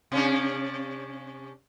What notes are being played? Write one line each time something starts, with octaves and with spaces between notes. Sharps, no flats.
C3 C#4 D4